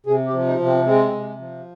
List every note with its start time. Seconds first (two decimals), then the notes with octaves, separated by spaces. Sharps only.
0.06 C3 G#4
0.26 G4
0.33 F3
0.47 D#4
0.59 C3
0.66 C4
0.85 G#3 C4
1.13 C3
1.39 F3